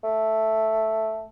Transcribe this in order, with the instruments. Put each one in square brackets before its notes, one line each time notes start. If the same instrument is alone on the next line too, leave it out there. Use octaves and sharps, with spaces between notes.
[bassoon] A3